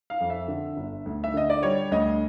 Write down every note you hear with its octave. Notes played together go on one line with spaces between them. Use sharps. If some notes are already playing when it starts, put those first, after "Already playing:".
F5
F2
E5
D3
G1
D2
E5
D3 D#5
D5
G3 C#5
D2 D#5